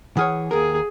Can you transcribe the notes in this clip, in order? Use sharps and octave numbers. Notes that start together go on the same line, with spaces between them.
E3 G#4 C#5 F#5 D#6 F6
D#2 G#4 A#4